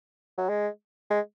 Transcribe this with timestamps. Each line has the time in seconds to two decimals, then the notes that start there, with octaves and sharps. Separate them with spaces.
0.38 F#3
0.49 G#3
1.10 G#3